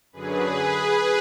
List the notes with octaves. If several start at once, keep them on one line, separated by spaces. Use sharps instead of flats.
F#2 D3 F#3 G#4 B4